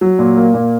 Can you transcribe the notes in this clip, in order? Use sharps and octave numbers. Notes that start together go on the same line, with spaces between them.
F#3
A#2
A#3
A#2